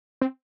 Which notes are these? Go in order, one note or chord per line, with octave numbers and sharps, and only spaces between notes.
C4